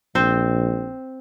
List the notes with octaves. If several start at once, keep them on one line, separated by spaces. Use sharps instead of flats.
A#1 C4 C5